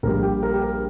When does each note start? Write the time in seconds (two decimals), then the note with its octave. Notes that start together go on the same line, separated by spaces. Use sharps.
0.03 A#1 A#2 G3 A#4
0.23 G4
0.43 A#4
0.54 G4
0.62 A#4